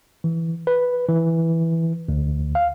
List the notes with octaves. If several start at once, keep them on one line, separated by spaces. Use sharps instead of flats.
E3
B4
E3
D2
F5